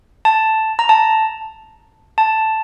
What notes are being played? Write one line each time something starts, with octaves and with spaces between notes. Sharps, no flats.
A5
A#5
A5
A5